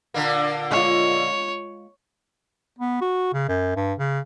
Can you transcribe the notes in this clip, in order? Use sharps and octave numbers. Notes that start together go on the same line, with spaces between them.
A#2 D3 A#3
G#3 F4 C#5
B3
F#4
C#3
F#2
G2
C#3